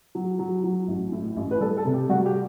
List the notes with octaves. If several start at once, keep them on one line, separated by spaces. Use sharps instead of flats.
F#3
F#3
F#3
A1
A2
A1
B4
G3 A4
A4
C3
G4
G3 F#4
G4